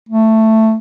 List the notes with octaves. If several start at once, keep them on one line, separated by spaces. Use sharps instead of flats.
A3